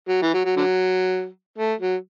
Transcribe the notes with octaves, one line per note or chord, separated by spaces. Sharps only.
F#3
E3
F#3
F#3
D3 F#3
A3
F#3